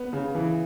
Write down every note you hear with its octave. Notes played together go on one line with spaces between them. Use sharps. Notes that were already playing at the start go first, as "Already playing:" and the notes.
Already playing: B3
C#3
E3